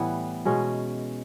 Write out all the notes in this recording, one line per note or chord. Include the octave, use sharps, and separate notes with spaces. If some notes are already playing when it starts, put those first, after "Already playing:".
Already playing: A2 E3 G3 B3
B2 G#3 C#4